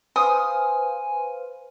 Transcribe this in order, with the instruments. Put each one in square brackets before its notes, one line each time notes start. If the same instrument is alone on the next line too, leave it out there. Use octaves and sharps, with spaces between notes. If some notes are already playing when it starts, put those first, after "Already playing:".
[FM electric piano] B4 C5 F5 [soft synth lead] G#5 [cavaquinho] D#6